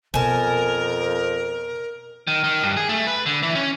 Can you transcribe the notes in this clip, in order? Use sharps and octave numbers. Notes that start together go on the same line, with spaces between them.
F2 B2 A#4 G#5 A5
D#3
D#3
G2
G#4
A3
B4
D3
E3
C#4